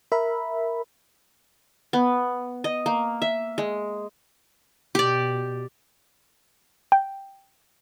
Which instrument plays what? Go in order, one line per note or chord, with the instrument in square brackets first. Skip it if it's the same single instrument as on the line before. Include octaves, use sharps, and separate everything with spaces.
[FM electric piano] A#4 E5 B5
[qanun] B3
D#5
A#3
E5
G#3
[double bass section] B2 [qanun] G4 D5
[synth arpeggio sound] G5